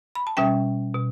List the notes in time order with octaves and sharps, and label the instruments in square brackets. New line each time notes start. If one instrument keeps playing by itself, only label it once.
[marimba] B5
A5
B2 G3 C#4 E5 G5
B2